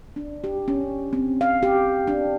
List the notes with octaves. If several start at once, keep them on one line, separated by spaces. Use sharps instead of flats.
D4
G4
C#4
C4
F5
G4
D4